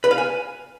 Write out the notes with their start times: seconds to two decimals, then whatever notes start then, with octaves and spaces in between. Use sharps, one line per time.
0.04 B4
0.11 F5
0.18 G#5